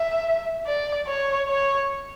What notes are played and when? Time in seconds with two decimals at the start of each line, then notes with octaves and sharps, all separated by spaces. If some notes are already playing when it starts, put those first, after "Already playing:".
Already playing: E5
0.66 D5
1.07 C#5
1.48 C#5